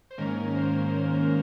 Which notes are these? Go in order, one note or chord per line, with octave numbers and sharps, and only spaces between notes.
C5
G#2 D#3 A#3 C#4 A#4
C5